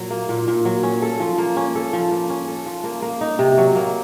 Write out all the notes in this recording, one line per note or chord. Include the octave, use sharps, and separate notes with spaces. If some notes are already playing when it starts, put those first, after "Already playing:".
Already playing: A#2 F#3
A#3
A#2
A#2
F#3
C#4
A4
F3
A#3
C#4
A4
F3
A#3
C#4
A4
F3
A#3
A#3
D#4
C3
F#3
A#3